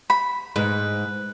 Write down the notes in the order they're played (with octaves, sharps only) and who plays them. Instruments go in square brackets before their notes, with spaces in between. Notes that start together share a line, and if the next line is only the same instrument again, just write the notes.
[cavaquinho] B5
[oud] G#2 [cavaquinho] B4